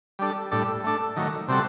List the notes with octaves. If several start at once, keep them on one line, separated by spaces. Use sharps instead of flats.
G3 D4 A4
A2 G3 D4 A4
A3 D4 A4
D#3 F#3 A3
C3 G3 C4 F#4 A4